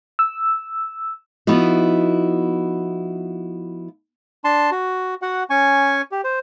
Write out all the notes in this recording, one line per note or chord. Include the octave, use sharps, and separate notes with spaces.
E6
F3 B3 D#4 E4 F#4
D4 A5 C6
F#4
F#4 F#5
C#4 G#5 C#6
G4
C5